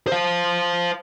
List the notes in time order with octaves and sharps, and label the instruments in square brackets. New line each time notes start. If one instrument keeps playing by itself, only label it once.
[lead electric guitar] C5 F5